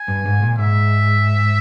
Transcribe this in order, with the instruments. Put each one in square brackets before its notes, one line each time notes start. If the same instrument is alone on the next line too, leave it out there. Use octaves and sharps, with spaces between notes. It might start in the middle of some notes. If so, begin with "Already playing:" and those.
Already playing: [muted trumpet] G#5
[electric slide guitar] G2
G#2
A#2
[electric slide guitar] G#2 [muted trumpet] E5